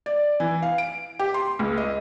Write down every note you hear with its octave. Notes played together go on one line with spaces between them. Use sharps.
D5
E3
F5
D7
G4
C6
C#2
D#5